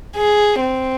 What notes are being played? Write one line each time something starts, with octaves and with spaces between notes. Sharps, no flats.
G#4
C4